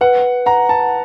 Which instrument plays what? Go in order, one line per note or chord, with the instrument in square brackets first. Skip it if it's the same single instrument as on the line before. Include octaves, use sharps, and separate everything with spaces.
[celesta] B4 [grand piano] F#5
[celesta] F#5 [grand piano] A#5
[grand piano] A5